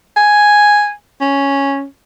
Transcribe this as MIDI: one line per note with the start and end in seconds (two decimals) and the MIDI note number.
0.17 0.92 80
1.21 1.85 61